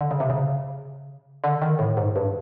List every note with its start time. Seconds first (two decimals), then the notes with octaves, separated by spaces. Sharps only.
0.01 D3
0.11 C#3
0.20 C3
0.30 C#3
1.44 D3
1.62 D#3
1.79 A2
1.97 G#2
2.16 G2